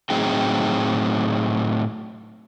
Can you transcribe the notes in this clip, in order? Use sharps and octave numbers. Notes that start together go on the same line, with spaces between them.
A2 F#3 C4 D#4 G#4 G5